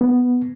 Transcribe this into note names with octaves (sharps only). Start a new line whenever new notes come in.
B3